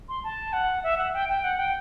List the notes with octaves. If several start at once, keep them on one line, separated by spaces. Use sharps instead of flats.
C6
A5
F#5
E5
F#5
G5
G5
F#5
G5